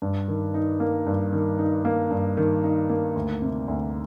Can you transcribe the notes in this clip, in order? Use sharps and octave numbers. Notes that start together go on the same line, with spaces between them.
G2
D#3
D#4
A#3
G2
D#3
D#4
A#3
G2
D#3
D#4
A#3
D2
C3
D2